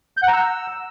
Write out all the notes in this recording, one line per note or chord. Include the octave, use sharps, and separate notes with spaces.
G6
F#5
A#5
E6